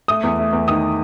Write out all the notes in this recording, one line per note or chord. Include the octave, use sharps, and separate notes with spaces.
A3 D#6
E2
A3
E2
D#3 D#6